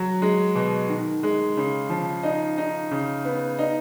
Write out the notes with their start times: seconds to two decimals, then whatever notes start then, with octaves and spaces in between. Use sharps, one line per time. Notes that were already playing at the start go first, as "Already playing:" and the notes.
Already playing: F#3
0.22 G#3
0.55 B2
0.89 D#3
1.23 G#3
1.57 C#3
1.90 F3
2.23 D#4
2.58 D#4
2.91 C#3
3.25 B3
3.59 D#4